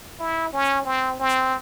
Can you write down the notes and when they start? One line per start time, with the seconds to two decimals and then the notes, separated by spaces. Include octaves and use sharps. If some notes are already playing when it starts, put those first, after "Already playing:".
0.20 E4
0.53 C#4
0.85 C4
1.19 C4